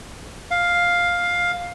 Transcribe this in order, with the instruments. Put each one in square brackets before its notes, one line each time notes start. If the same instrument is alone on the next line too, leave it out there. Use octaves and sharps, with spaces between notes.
[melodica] F5